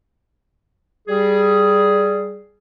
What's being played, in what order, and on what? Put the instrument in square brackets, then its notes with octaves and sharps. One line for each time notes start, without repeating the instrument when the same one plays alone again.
[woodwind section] G3 G#4